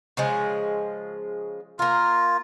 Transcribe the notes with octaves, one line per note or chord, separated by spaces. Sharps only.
C#3 F3 G#3
A#3 F4 A#4